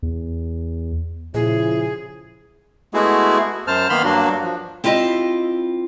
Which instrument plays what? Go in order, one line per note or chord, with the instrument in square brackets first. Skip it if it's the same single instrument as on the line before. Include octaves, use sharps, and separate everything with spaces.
[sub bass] E2
[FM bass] A#2 [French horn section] C#3 F3 E4 [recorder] G#4
[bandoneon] G#3 A3 B3 E4 F#4 G#4
F#2 C5 A5 F6
D#3 A#3 B3 B5 C6 F6
G2 F#3 A#3 D4 F#4
F3
[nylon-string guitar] C4 E4 F4 G4 D#5